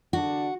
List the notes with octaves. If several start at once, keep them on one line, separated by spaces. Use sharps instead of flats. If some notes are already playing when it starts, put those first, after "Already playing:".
D3 D4 F#4